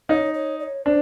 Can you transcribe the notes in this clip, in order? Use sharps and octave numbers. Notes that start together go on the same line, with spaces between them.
D#4 C#5
C#5
D5
C#5
D4 C5